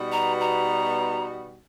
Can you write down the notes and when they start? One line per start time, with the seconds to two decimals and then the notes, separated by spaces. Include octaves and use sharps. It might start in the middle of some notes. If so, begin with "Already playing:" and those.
Already playing: B2 G3 B3 D#4 F#4
0.12 A#5
0.41 A#5